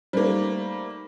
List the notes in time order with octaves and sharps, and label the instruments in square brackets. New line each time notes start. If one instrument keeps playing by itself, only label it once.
[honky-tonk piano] G3 A3 A#3 [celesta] D#4 C5